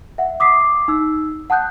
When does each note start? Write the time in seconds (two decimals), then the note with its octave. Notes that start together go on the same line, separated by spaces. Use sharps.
0.18 E5 F#5
0.40 D6 D#6 B6 C7
0.88 D#4 E6
1.50 F#5 A5 D#6 F#6 G6